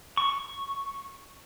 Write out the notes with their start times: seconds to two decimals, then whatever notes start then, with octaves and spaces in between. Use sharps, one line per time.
0.17 C#6